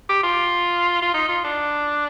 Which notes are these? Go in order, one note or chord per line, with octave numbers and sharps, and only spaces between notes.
G4
F4
F4
D#4
F4
D4